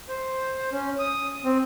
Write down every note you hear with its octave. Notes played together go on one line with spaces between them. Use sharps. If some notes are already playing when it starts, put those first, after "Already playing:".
C5
C#4
D#6
C4